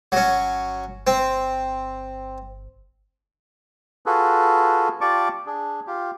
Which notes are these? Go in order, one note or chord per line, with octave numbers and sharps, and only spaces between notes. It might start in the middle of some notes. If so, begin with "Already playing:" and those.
G1 F#3 C#4
C4
F4 F#4 G#4 A4 B4
F4 G4 D5 A5 C#6 D6
D4 G#4
F4 G4